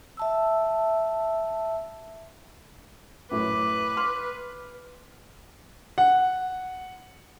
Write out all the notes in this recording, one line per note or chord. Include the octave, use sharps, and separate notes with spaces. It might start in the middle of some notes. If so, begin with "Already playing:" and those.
E5 A5 E6
F#2 A2 E4 B4 D6
C6 F6
F#5